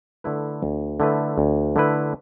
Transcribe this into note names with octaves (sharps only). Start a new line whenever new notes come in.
D3 A3 E4 B4
D2
D3 A3 E4 B4
D2
D3 A3 E4 B4